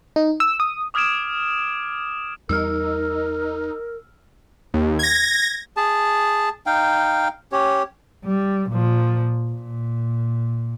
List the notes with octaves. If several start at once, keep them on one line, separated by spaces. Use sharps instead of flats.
D#4
E6
D#6
D6 D#6 F6 G#6 D7 E7
E2 G3 D#4 A#4 E6 F6
D#2
G#6 A#6
G#4 A5
D#4 F5 G5
C#4 G4 C#5
G3
A#2 F3
A#2